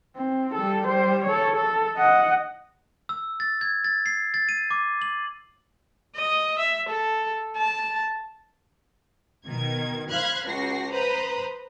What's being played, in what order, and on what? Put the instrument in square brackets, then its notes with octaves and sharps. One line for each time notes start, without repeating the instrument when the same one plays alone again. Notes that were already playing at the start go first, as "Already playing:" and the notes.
[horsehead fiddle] C4
G3 A4
G3 C5
A4 C#5
A4
D#5 F#5
[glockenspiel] E6
A6
G#6
A6
C7
A6
D#7
D6
F#7
[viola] D#5
E5
A4
A5
[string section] B2 D#3 G#6
C5 F5 B5 F6 F#6 G#6
C#2 F#4 A#6 C7
B4 C5 A#5 B5 D#6